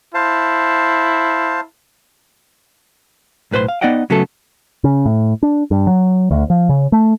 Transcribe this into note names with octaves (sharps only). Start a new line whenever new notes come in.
E4 C5 F5 A5
B1 A2 B4 C5 C6
F5
B3 D#4 D5 D#5 F#5 G5
C#3 F#3 A3 B3 A4
C#3
A2
D4
G2
F#3
D2
F3
C#3
A3